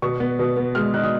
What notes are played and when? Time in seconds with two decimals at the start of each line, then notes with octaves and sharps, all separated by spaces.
0.02 B2 C#6
0.20 B3
0.39 B2
0.56 B3
0.75 G#3 F6
0.94 D#4 F#6
1.04 D#6